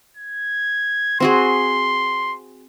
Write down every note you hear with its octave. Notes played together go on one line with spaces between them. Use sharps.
G#6
C4 F#4 G#4 C6